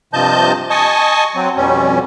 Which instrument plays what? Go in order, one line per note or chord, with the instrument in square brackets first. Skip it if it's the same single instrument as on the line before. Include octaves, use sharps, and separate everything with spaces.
[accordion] G2 C3 F3 D#5 A5 G6
D#5 G#5 A5 C#6 D#6
F#3 C4
F2 B2 G3 C#4